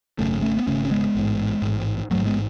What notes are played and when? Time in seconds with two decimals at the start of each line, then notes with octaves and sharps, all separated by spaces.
0.19 G#1 F#2 C#3 A3 C#4
0.42 A3 C#4
0.57 B3
0.67 G#1 F#2 C#3 A3 C#4
0.85 C#4
0.91 G#3 B3
1.15 A1 G#2
1.62 A1 G#2
2.10 A1 G#2 F#3 A3
2.26 G#3 B3